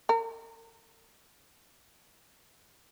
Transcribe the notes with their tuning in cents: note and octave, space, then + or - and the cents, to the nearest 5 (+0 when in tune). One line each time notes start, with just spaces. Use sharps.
A#4 -45